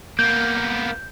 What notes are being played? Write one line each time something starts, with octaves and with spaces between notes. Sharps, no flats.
A#3 B3 G6